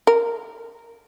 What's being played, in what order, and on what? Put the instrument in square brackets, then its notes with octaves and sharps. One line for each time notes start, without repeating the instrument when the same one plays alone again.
[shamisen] A#4